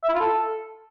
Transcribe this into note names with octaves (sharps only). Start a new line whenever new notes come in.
E5
E4
F4
A4